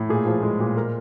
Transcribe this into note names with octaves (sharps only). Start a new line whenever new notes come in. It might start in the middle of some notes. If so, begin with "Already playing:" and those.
Already playing: A2
A#2 G#4
F3
G#3
A#2
A#4